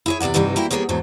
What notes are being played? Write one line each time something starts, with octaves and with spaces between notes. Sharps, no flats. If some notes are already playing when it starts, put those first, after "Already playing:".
E4 G#4 C#5
E2 C3 F3 D5 F#5
G2 C3 E3 G3 B3 D#4
A#3 E4 F#4 G4
G3 A#3 B3 G#4 C#5
E2 G#2 F#3 A4